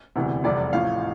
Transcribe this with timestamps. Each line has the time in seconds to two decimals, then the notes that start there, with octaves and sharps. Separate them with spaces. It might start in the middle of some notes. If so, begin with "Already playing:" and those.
0.16 E1 D2 C3 E3
0.44 F1 E2 C3 G3 D5
0.72 A1 A2 F3 F5